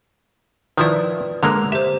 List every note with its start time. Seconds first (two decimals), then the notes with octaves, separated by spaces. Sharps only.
0.77 D#3 F3 E4 B4 D5
1.43 D3 G#3 A#3 A#5 F6 F#6
1.72 G4 C5 E5